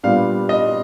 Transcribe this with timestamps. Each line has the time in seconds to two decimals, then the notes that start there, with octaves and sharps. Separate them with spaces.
0.03 A#2 G3 B3 D4 F5
0.49 D#5